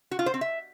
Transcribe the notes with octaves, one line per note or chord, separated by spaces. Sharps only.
F#4
F4
C5
C4
E5